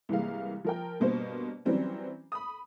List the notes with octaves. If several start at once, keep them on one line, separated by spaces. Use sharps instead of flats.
C2 E3 G#3 A#3 F5
F3 A#4 G5
G2 B2 A#3 C5
E3 F#3 G3 C4 C#4
B5 D#6